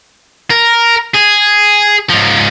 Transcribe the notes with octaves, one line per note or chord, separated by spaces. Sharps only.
A#4
G#4
G#2 F3